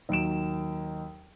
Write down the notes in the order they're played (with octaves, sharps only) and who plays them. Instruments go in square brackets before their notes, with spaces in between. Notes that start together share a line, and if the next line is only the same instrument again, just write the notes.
[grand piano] D#2 F#3 D7 E7